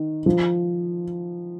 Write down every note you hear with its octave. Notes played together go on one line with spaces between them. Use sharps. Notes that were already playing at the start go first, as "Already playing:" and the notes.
Already playing: D#3
F3